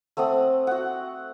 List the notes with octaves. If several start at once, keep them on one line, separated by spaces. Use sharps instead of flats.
A3 C4 F#5 D#6
F#4 F#5